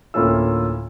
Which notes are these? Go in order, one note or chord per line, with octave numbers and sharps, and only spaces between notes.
D2 A2 A#3 C#4 F4 E6